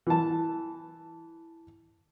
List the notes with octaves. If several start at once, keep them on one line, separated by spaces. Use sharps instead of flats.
E3 A5